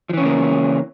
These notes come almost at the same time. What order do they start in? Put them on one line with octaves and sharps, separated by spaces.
F3 E3 C#4 C#3 A#3